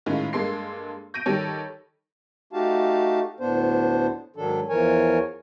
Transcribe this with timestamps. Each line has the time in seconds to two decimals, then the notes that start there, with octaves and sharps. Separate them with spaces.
0.06 A2 D#3 G#3 C#4 F4
0.33 G2 G#3 A#3 A4 C6 C7
1.14 G6 A#6 D7 D#7
1.26 D#3 G3 G4 A4 C#5
2.53 A3 D#4 F#4 G4 F5 A5
3.40 D2 A2 B3 D4 C5
4.36 G#2 D#3 F#3 D4 A4
4.69 E2 E3 F3 A#4 C#5 G#5